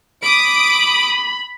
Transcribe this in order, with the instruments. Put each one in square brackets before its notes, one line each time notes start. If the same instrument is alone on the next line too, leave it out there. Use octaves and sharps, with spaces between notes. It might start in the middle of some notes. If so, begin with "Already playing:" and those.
[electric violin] B5 [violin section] D6 D#6 D7